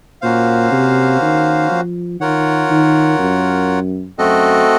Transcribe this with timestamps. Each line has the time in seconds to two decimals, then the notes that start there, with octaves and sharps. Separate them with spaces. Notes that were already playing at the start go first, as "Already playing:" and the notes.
0.22 A#2 A#3 C#4 F#4 C5 F5
0.72 C3
1.22 D#3
1.71 F3
2.20 D#3 F4 A#4 C#5 F#5
2.70 D#3
3.19 F#2
4.18 F#2 A3 C4 F#4 A4 D#5